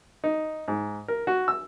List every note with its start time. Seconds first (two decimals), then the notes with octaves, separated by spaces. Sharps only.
0.24 D#4
0.68 G#2
1.08 A#4
1.27 F#4
1.48 E6